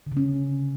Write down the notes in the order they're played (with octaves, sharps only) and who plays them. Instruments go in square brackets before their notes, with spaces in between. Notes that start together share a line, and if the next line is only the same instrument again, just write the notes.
[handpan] D3
C#3
C#4